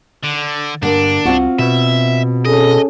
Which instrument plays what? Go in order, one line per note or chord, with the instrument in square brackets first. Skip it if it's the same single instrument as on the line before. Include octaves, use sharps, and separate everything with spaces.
[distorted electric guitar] D3
[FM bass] G2 [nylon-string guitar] D3 A#3 [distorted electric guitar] D4
[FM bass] C2 [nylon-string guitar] C4 F4 F#4
[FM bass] B2 [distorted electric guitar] E5
[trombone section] C#4 G#4 A4 [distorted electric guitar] D#5